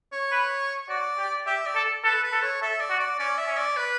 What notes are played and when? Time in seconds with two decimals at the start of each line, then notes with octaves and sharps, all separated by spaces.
0.12 C#5
0.32 B4
0.89 F#4 D5
1.18 G4
1.46 G4 E5
1.66 D5
1.75 A4
2.04 A4 B4
2.23 B4
2.32 A4
2.42 C#5
2.62 A4 E5
2.80 D5
2.90 F#4
3.00 D5
3.19 C#4 D5
3.38 E5
3.48 C#4
3.57 D5
3.77 B4